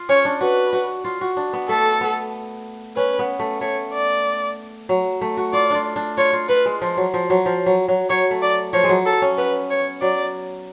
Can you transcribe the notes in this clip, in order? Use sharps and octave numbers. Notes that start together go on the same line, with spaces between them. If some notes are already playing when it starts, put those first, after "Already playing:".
Already playing: F4
C#4 C#5
D4
F#4 B4
F#4
F4
F#4
D4
B3
A3 A4
B3
C#4 B4
B3
A3
A3 C#5
D5
F#3
A3
F#4
F4 D5
D4 F4
D4
F4 C#5
F4
F4 B4
G#3
F3
F#3
F3
F#3
F3
F#3
F#3
F#3 C#5
A3
D5
F3 C#5
G#3
F#3
A4
C#4
B3 B4
C#5
F#3 D5